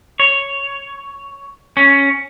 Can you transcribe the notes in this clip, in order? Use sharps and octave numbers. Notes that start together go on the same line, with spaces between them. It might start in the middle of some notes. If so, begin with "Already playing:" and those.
C#5
C#4